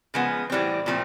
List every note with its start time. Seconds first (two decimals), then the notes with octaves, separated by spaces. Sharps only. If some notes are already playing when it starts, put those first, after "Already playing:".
0.14 C#3 F3 G#3 B3
0.50 A2 E3 G3 C4
0.86 A#2 F3 A3 C4